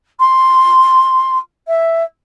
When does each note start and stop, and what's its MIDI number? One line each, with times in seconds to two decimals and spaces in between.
0.19 1.38 84
1.67 2.03 76